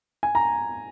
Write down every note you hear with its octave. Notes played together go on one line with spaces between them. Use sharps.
G#5
A#5